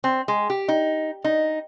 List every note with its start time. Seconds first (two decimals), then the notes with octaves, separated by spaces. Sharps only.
0.04 C4
0.28 G#3
0.50 G4
0.68 D#4
1.24 D#4